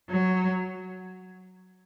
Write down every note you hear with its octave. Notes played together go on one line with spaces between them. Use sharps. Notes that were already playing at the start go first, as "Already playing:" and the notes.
F#3